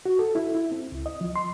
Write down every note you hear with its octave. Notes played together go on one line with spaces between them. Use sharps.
F#4
A4
E4
E4
C4
C#2
D#5
F3
C6